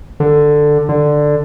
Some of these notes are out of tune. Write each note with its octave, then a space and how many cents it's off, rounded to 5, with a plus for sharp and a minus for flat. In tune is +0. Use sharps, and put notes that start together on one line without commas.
D3 +10
D3 +10